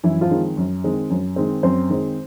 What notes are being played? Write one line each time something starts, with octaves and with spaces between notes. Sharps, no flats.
F#2 E3 E4
F3 F4
D#3 G#3 C4
F#2
D#3 G#3 C4
F#2
D#3 G#3 C4
F#2 C4 C5
D#3 G#3 C4